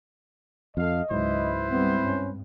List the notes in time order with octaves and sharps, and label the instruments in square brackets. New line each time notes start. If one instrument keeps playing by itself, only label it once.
[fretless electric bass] F2 [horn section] A4 F5 [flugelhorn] D#5
[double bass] C#2 [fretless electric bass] G#2 F#3 [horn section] E4 B4 C5
[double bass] G3 C4 [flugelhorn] B3
[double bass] G2 [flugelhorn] C#4